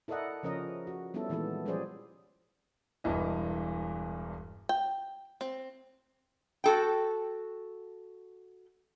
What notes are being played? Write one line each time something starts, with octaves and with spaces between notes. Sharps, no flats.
E4 A4 A#4 D5 D#5 F#5
C#3 F3 C#4 A#4 D#5
F#4
G3 B3 C#4 E4 A4
A#2 D#3 E3 G#3 B3 A4
F3 G3 C#4 G#4 C5 D5
E1 G2 E3 D#5
G5
C4
F#4 A4 G5